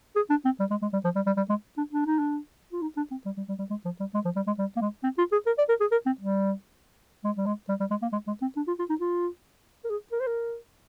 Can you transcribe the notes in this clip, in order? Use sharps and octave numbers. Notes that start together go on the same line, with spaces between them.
G#4
D4
C4
G3
G#3
G#3
G3
F3
G3
G3
G3
G#3
D4
D4
D#4
D4
F4
D#4
D4
C4
G3
G3
G3
G3
G#3
F3
G3
G#3
F3
G3
G#3
G3
A#3
G#3
C4
F4
G#4
A#4
D5
A#4
G#4
A#4
C4
G3
G#3
G3
G#3
G3
G3
G#3
A#3
G#3
G#3
C4
D4
F4
F4
D#4
F4
A#4
G#4
A#4
C5
A#4